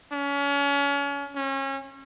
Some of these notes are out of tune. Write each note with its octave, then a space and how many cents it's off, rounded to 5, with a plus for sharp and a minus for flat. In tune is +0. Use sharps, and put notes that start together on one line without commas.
C#4 +35
C#4 -30